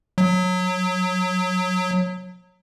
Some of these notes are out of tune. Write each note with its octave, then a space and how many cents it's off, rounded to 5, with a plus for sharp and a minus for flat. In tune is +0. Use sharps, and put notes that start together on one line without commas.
F#3 -20